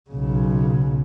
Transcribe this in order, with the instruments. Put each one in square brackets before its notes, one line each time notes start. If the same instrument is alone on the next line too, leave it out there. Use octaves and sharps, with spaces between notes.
[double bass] B1 C#3